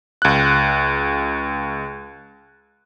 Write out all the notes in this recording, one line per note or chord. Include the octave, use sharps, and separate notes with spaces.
C#2 F#6